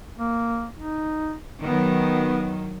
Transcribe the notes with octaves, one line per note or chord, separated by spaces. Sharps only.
A#3
D#4
D#3 F#3 B3